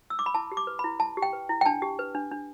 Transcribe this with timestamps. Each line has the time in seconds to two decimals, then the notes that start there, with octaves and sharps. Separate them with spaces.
0.10 E6
0.19 D6
0.26 B5
0.34 E4 A5
0.52 G4
0.57 D6
0.67 B4
0.79 B5
0.84 E4
1.00 E4 A5
1.17 G4
1.22 G5
1.33 B4
1.49 E4
1.61 G5
1.66 D4 A5
1.82 G4
1.99 B4
2.15 D4
2.31 D4